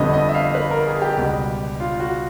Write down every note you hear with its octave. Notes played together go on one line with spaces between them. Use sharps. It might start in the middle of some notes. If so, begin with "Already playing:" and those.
Already playing: G1 F2 D3 G3 B3 D#5
D#5
E5
F5
B4
A#4
G#4
G4
C#2 B2 G3
F4
F#4